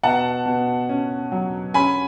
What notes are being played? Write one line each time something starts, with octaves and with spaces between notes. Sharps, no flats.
B2 F#5 A5
B2
C#4
F#3
C#4 G#5 B5